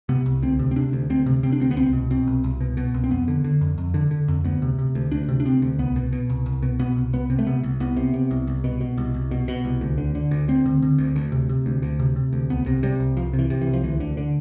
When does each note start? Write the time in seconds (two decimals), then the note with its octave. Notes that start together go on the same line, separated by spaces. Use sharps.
0.09 C3 B3
0.26 C2
0.42 D2 C4
0.59 C3
0.71 C4
0.76 C3 D4
0.93 D2
1.10 D2 C4
1.26 C3
1.43 C3 C4
1.52 D4
1.60 D2 C4
1.71 B3
1.77 C2 C4
1.93 B2
2.11 B2 C4
2.27 C2
2.44 C2
2.61 B2
2.77 B2
2.94 C2
3.04 C4
3.11 F2 B3
3.28 D3
3.44 D3
3.61 F2
3.78 F2
3.94 D3
4.11 D3
4.28 F2
4.44 D2 B3
4.62 C3
4.79 C3
4.95 D2
5.11 D2 D4
5.29 C3
5.40 D4
5.45 C3 C4
5.62 D2
5.79 C2 B3
5.96 B2
6.13 B2
6.30 C2
6.46 C2
6.63 B2
6.79 B2 B3
6.96 C2
7.13 C2 B3
7.30 C3
7.39 A3
7.47 C3 B3
7.63 C2
7.80 C2 B3
7.97 C3
8.14 C3
8.31 C2
8.47 C2
8.64 B2
8.81 B2
8.98 C2
9.14 C2
9.31 B2
9.48 B2
9.65 C2
9.81 D2
9.98 D3
10.15 D3
10.31 D2
10.48 D2 C4
10.66 D3
10.82 D3
10.98 D2
11.16 D2
11.32 C3
11.49 C3
11.66 D2
11.82 D2
11.99 C3
12.16 C3
12.33 D2
12.50 C2 B3
12.66 C3
12.83 C3 G3
13.00 C2
13.17 C2 F3
13.33 C3
13.39 E3
13.50 C3
13.61 E3
13.67 C2
13.73 F3
13.83 D2 E3
14.00 D3
14.17 D3